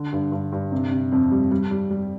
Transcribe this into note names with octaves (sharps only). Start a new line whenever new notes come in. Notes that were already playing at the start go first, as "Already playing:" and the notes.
Already playing: D3
G2
G2
G2
C3
C3
F2
G3
G3
G3
G3